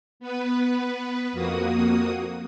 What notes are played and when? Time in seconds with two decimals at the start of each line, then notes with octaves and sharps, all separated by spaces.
0.20 B3 B4
1.33 F2 A#3 F#4 D#6